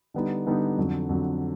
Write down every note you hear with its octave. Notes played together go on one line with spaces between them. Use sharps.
D3 G3 B3 D#4
D3 G3 B3 D#4
F2 D3 F#3
F2 D3 F#3